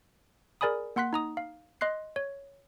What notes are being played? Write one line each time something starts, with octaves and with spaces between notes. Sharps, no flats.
G#4 A#4 D5 G#5 B5 D#6
A#3 F#5 C6 F#6 B6
D#4 A#5 D#6
F5
D#5 C6 F#6 C7
C#5